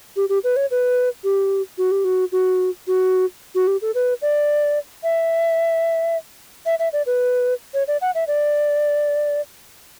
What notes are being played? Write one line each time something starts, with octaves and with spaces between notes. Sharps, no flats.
G4
G4
B4
C#5
B4
G4
F#4
G4
F#4
F#4
F#4
F#4
G4
A4
B4
D5
E5
E5
E5
D5
B4
C#5
D5
F#5
E5
D5